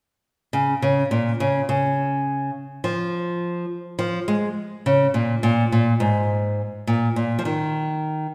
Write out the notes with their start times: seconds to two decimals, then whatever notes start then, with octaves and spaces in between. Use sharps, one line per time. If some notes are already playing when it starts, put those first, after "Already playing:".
0.53 C#3
0.82 C#3
1.11 A#2
1.40 C#3
1.69 C#3
2.84 F3
3.99 F3
4.28 G#3
4.86 C#3
5.14 A#2
5.43 A#2
5.72 A#2
6.00 G#2
6.87 A#2
7.16 A#2
7.39 F3
7.45 D#3